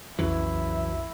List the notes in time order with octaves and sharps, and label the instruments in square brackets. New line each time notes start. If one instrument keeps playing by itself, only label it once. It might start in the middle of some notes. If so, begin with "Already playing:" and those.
[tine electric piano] B1 F2 [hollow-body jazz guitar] C#3 E3 F#3 [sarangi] E4